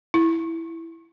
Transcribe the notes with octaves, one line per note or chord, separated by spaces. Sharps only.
E4